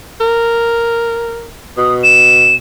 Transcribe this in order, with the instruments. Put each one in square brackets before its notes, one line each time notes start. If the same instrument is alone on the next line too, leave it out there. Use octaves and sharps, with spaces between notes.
[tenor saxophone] A#4
[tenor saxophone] B2 [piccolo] D#6
[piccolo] E7